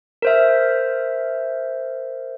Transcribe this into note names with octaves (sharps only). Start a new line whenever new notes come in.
A#4 C5 E5